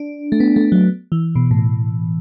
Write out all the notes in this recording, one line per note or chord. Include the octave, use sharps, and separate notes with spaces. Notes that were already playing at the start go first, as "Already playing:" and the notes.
Already playing: D4
A3
B3
A3
F#3
E3
B2
A2